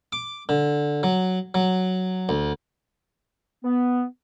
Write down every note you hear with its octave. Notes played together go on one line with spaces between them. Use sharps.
D6
D3
F#3
F#3
D2
B3